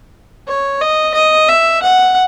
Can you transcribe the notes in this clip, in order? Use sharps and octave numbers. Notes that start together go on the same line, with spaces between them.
C#5
D#5
D#5
E5
F#5